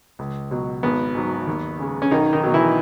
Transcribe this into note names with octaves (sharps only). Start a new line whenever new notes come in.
C#2
B2 F#3
G#1 B3
G#2 F#3
D#2
C#3 G#3
C#4
B1 D#3 D#4
D#3 D#4
B2 F#3
E3 E4